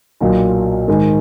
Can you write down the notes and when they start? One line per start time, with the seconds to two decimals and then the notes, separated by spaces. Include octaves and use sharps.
0.20 B1 A#2 F#3
0.88 G#2 D#3 G#3